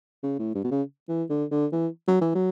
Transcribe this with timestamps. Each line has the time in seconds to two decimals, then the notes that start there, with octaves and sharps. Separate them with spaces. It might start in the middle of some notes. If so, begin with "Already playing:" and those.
0.23 C#3
0.39 A2
0.55 G2
0.64 B2
0.71 C#3
1.09 E3
1.30 D3
1.51 D3
1.72 E3
2.08 F#3
2.21 E3
2.35 F#3